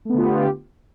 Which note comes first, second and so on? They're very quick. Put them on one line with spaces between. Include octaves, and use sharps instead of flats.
A3 B3 D3 F4 G4